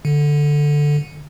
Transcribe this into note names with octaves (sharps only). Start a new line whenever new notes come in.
D3